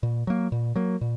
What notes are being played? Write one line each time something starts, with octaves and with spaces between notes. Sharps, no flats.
A#2
F#3 A#3
A#2
F#3 A#3
A#2